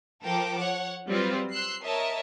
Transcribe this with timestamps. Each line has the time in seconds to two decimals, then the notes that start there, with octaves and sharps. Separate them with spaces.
0.23 F3 A4 A#4 G5 D6
0.61 C#5 F#5
1.08 F#3 G3 C4 F4 B4 C5
1.51 C6 E6 F#6 C7
1.84 A#4 C#5 D#5 E5 A5